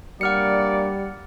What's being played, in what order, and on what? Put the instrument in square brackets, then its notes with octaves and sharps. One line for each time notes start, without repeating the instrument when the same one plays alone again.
[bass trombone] G3 [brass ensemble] A#3 D4 D5 [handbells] F#5 F6 C#7